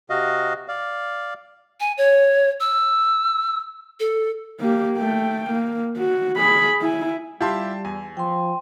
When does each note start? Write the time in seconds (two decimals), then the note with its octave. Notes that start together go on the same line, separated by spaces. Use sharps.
0.10 C3 F#4 D#5 F5
0.68 D5 F5
1.80 G#5
1.98 C#5
2.60 E6
4.00 A4
4.60 A#3 G4
4.97 A3 G5
5.50 A#3
5.97 F#4
6.37 G#4 B5
6.81 E4 G#5
7.41 G3 E4 F4 G4 G5 A5 C6
7.85 E2 G#5
8.17 F3 G5 C6